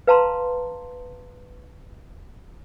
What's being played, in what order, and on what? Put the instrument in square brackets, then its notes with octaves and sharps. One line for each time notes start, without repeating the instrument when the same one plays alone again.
[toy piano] B4 F5 A5 A#5 C6